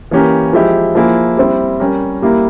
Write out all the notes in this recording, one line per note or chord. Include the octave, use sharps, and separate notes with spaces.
E3 A#3 C#4 G4 A#4
F3 G#3 E4 G4
F3 A#3 E4 G#4
G3 C4 E4
G3 C#4 G4 A#4
G3 A#3 E4 G4 A#4